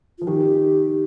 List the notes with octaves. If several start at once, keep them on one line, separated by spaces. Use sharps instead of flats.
F3 F4
D#3 G4